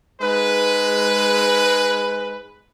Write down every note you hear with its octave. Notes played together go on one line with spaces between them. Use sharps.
G#2 G#3 B4